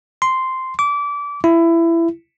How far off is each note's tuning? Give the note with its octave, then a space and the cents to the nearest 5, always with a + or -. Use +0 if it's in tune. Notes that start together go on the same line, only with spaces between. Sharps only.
C6 -5
D6 -25
E4 +20